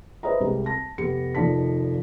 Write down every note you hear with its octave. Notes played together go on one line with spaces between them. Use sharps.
B4 C5 D#5 E5 A#5
C2 G3 G#3
A5 A#6
F1 B3 G4 C#7
F1 D#3 F3 D5 A5 B6